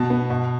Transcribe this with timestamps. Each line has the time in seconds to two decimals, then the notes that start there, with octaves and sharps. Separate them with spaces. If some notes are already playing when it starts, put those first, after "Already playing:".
Already playing: B2 A5
0.10 B3
0.30 B2